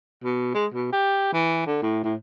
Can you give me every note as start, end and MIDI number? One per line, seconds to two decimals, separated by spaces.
0.24 0.54 47
0.54 0.66 56
0.74 0.88 47
0.93 1.32 67
1.33 1.62 52
1.66 1.79 50
1.83 2.03 45
2.03 2.15 45